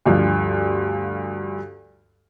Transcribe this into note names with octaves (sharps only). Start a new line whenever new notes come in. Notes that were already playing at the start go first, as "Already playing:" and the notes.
D2 G2 F3